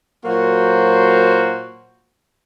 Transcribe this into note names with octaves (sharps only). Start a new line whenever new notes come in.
A#2 F#3 A#3 F#4 C5